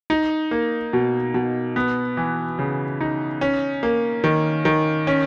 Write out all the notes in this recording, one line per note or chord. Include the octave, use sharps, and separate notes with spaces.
D#4
A#3
B2
B2
B3
E3
C#3
D#4
C#4
A#3
D#3
D#3
C#4